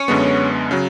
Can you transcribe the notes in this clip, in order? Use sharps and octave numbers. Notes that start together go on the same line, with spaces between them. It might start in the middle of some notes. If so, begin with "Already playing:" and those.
Already playing: C#4
F#2 D3 G#3 B3
C#3 F#3